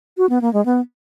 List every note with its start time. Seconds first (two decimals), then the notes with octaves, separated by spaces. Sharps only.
0.17 F#4
0.29 B3
0.41 A#3
0.53 G#3
0.65 B3